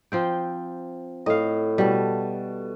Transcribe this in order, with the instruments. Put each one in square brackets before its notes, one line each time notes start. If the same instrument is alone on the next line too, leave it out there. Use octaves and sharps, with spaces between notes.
[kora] F3 C4 G5
[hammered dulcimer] A2 [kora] D#5 F5
[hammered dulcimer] B2 A5 [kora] G3